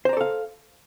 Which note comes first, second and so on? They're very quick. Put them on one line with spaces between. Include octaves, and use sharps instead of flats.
C5 A#5 D5 A4 F5